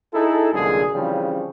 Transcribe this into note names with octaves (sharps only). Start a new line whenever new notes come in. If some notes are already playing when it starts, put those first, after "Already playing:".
D#4 E4 G#4 A4
C2 F#2 A#2 D3 G#3 G#4
C#3 E3 F3 G3 C4 C#4